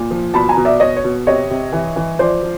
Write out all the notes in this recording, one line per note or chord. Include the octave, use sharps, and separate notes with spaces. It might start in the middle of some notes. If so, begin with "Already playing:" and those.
Already playing: A#2
F3
B2 A5 B5
G#5 A#5
B2
D5 E5
B2 C#5 D#5
C#5
B2
C3 C#5 D#5
C3
E3
E3
F3 C5 D5
F3